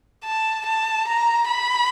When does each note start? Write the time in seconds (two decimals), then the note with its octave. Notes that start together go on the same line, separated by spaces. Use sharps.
0.24 A5
0.66 A5
1.07 A#5
1.48 B5